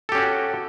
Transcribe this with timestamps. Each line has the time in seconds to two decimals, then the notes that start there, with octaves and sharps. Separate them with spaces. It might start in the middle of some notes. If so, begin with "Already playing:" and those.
0.09 A4
0.12 G4
0.15 C#4
0.18 F#4